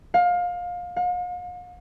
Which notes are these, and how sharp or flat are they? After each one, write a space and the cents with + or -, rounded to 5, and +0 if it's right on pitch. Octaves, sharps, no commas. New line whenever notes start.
F5 +25
F5 +45